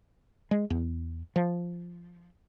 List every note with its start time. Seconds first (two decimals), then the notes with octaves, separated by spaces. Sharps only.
0.51 G#3
0.70 E2
1.36 F3